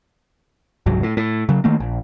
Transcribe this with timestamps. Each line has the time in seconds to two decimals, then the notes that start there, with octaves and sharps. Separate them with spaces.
0.86 F1 C#2 G#2 F#3
1.03 A2
1.17 A2
1.49 C#3 F#3
1.64 D#3 A3 A#3
1.80 A#1